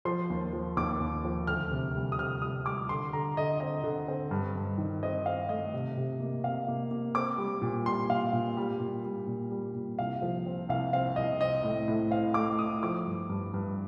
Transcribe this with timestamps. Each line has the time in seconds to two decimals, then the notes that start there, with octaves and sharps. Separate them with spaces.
0.05 F3 C6
0.30 D#2
0.53 F3
0.77 D#2 D6
1.00 D#2
1.25 F3
1.47 D2 F6
1.71 C3
1.95 G3
2.12 D#6
2.18 C3 F6
2.42 G3 D#6
2.66 G3 D6
2.89 D3 C6
3.13 D3 A#5
3.37 D3 D#5
3.60 C4 D#5
3.84 D3
4.08 C4
4.31 G2
4.56 G2
4.78 D#3
5.03 C4 D#5
5.26 C4 F5
5.49 A3 D#5
5.73 C3
5.97 C3
6.20 A#3
6.44 C3 F5
6.68 A#3
6.91 A#3
7.15 C4 D6
7.38 G3
7.62 A#2
7.86 G3 C6
8.10 A#2 F5
8.33 A#2
8.57 G3
8.80 A#2
9.05 G3
9.27 A#2
9.51 G3
9.75 A#2
9.99 C2 F5
10.22 F3
10.46 C4
10.69 C2 F5
10.93 C4 F5
11.16 C2 D#5
11.40 C4 D#5
11.63 A2
11.88 A2
12.11 C4 F5
12.34 A3 D6
12.59 A3 D#6
12.83 F3 D6
13.06 G2
13.29 G2
13.54 G2